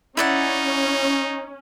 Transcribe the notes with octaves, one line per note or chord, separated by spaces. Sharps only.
C#4 D#4 E4 D5 F#5